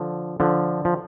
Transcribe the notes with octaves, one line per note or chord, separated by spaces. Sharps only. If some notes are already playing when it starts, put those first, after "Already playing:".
Already playing: D3 F3
D3 F3
F3